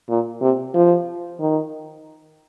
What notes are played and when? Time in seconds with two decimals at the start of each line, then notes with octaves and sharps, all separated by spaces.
0.09 A#2
0.41 C3
0.74 F3
1.40 D#3